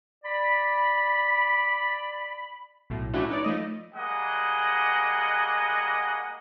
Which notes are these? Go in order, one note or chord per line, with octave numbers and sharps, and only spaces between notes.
D5 B5
B1 A2
F3 A3 C#4 D4 E4 F#4
D#4 B4 C#5 D5
F3 A3 D#5
G3 G#3 A#3 D#5 F#5 G#5